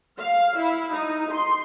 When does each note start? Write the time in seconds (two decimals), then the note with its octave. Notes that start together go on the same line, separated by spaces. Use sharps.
0.20 F5
0.57 E4
0.93 D#4
1.32 C6